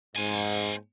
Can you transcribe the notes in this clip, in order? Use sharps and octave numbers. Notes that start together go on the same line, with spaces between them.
G#2 C4 G#5